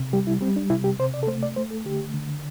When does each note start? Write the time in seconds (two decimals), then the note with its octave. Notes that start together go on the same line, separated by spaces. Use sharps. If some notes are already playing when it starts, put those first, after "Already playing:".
Already playing: C3
0.13 G3 G4
0.27 E4
0.41 G3 C4
0.56 D4
0.70 C3 E4
0.84 G4
0.99 C3 C5
1.14 D5
1.23 A4
1.27 A3 C5
1.43 D5
1.56 A3 C5
1.70 A4
1.85 D3 G4
2.14 D3